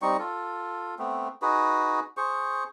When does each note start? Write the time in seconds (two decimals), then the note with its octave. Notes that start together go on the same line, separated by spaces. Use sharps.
0.02 G3 C4 D#4 C#6
0.19 F4 A4
0.99 A3 B3 C4
1.42 D#4 F#4 G#4 B4
2.17 G#4 C5 C#6